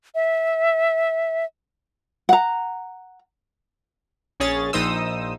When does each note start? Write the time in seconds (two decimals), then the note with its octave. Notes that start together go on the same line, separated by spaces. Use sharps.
0.15 E5
2.29 F#5 A#5
4.40 A#1 C#4 G#4 C#5 A6
4.73 A#1 A#2 D#4 C5 D#6 E6